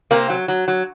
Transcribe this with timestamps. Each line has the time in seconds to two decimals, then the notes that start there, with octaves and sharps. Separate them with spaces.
0.11 C3 A#3 C4
0.30 F#3
0.48 F#3
0.68 F#3